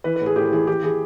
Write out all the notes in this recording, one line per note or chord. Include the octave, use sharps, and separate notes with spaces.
E3 B4
B4
A2 G#4
A2 G4
E3 G#4
E3 G4
E3 G#4